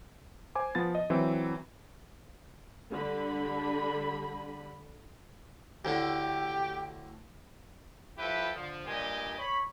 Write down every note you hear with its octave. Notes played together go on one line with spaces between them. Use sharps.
C5 G#5 D6
F3 B3 A6
D#5
E3 F#3 C4 E4
D3 G3 B5
D2 A2 D3 G4
F3 E4 G4 A4 B4
D3 F3
G2 A#2 G4 D#5 G#5
C#5 B5